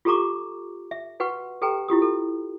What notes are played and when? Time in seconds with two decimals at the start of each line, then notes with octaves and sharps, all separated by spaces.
0.05 F4 G4 A4 A#5 C#6 D6
0.91 E5
1.20 F#4 B4 F#5 C#6
1.62 G4 A4 B4 G5 G#5 A#5
1.88 E4 F4 G4 D#6
2.02 A4